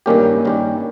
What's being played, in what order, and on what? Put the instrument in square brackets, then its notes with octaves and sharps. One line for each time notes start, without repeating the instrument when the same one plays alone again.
[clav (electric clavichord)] G2 D#3 G3 C#4 G4 [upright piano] A#3
[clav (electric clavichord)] G2 D#3 G3 C#4 G4